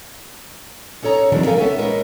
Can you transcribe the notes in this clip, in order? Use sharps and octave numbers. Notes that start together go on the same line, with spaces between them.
C#4 D#4 A4 C#5 A#5
D#3 F3 G3 A#3 C4 D4
A#3 D#4 A4 A#4 F5 G#5
B3 C#4 A4 E5
A#2 G#3 C#4 D#4 A#4 B4